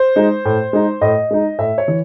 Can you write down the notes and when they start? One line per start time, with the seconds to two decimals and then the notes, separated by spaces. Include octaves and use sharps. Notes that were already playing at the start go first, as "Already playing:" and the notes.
Already playing: C5
0.16 G#3 D#4
0.45 A2
0.73 G#3 D#4
1.01 A2 D#5
1.31 G#3 D#4
1.59 A2 E5
1.78 C#5
1.88 E3